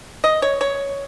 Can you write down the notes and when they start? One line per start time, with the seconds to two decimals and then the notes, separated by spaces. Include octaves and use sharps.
0.24 D#5
0.42 C#5
0.61 C#5